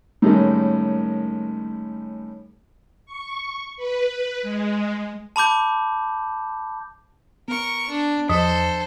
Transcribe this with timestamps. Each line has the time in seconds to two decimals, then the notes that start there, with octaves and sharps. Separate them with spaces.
0.22 A2 D#3 G3 G#3 A#3 C#4
3.06 C#6
3.77 B4
4.42 G#3
5.36 A5 B5 D6 G6
7.48 B3 A#4 C#6
7.89 D4
8.29 E2 F3 A4 C5